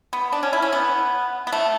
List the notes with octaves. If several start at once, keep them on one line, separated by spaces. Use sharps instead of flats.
B3
D4
C#4
E4
C#4
B3
B3
A3